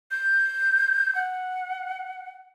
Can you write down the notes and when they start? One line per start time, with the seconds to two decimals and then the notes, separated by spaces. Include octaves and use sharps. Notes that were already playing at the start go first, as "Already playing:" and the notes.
0.11 G6
1.15 F#5